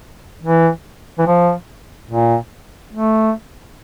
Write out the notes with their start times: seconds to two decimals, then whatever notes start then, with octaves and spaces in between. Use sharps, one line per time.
0.43 E3
1.18 E3
1.26 F3
2.10 A#2
2.93 A3